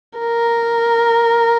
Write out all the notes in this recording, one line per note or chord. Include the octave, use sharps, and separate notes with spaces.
A#4